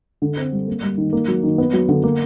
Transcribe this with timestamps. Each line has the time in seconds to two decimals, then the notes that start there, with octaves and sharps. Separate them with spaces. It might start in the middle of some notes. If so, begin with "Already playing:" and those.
0.22 D3
0.37 C4
0.52 G3
0.68 A#3
0.83 G3
0.98 D#3
1.13 A#3
1.28 F#3
1.43 D#3
1.58 B3
1.73 F#3
1.89 D3
2.04 A#3